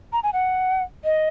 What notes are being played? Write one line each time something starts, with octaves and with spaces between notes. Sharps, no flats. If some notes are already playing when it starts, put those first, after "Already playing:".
A#5
G#5
F#5
D#5